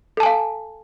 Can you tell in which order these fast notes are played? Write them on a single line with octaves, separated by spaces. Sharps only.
A4 A5 G#5 F5